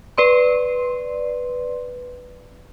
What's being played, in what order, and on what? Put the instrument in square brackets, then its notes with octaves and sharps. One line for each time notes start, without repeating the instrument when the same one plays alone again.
[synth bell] B4 D5 C6